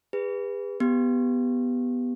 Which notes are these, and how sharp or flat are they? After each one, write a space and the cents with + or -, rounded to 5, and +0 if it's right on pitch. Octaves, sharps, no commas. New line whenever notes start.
G#4 -40 B4 +0
B3 +0 G4 +0